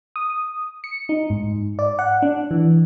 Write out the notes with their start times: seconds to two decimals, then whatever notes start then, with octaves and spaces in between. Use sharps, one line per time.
0.16 D#6
0.84 C#7
1.09 D#4
1.30 G#2
1.79 D5
1.99 F#5
2.22 D4
2.51 E3